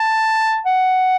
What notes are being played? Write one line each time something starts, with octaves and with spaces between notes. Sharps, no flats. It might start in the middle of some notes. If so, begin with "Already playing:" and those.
Already playing: A5
F#5